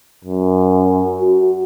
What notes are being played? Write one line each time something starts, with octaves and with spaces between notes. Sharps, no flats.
F#2
F#4